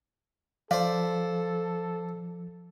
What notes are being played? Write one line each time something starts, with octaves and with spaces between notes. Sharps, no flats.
F3 A4 C5 D5 F5